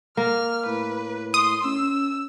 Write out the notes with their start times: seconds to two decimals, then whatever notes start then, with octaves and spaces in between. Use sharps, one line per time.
0.17 A#3 F6
0.66 A2 B4
1.34 C6 D#6
1.65 C#4 E6